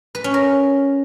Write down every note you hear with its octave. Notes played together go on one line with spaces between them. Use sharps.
B4
C#4
A#4